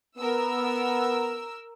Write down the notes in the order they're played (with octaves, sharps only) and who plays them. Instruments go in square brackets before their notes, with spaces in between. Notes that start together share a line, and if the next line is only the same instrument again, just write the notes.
[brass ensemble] B3 [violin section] A#4 E6